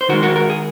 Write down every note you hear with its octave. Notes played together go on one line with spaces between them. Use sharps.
C5
D#3 G#3 F#4 A#4
F#4 A#4
A#4
G#4